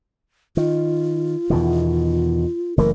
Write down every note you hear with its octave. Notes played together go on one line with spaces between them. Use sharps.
D#3 F4
E2 B2 D#3
F#1 E3 A3 A#4